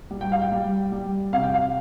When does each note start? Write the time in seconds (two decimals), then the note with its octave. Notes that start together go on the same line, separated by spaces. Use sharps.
0.11 G3
0.21 G5
0.32 F5
0.42 G5
0.52 G3
0.92 G3
1.33 C3 F5
1.43 G5
1.54 F5